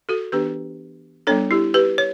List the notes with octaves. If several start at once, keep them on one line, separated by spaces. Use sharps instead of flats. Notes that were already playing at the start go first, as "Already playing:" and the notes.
F#4 A4
E3 B3 D4 G4 B4
G3 B3 D4 A4 C#5
E4 G4
G4 B4
C#5